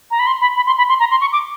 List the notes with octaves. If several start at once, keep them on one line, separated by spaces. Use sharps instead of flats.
A#5
B5
C6
B5
B5
C6
B5
C6
A#5
C6
C#6
D6